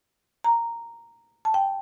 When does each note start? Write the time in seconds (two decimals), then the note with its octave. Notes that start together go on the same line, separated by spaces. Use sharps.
0.44 A#5
1.45 A5
1.54 G5